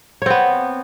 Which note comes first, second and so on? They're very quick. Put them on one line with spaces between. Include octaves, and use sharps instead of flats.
C#5 C4 B3